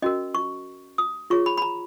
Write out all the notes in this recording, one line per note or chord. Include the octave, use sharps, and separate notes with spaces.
C#4 F#4 A#4 D#5
C#6
D#6
F4 G#4 C#5 C#6
B5
B5
A#5